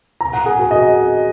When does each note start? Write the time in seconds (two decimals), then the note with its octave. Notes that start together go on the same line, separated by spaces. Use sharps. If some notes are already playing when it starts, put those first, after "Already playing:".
0.21 A#5
0.33 F#5
0.46 G#4
0.59 F#4
0.71 D#5